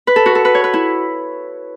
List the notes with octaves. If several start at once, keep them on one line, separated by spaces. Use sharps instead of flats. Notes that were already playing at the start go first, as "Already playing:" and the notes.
B4
A4
F#4
A4
B4
C#5
B4
E4